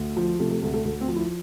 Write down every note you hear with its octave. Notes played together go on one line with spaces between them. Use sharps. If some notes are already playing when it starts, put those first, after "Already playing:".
Already playing: D2
F3
C3 A3
A3
D2 A3
A3
D2 A3
C4
F3
E4